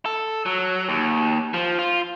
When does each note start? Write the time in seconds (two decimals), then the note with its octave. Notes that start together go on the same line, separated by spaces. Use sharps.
0.06 A4
0.46 F#3
0.89 D#2
1.54 F3
1.79 F4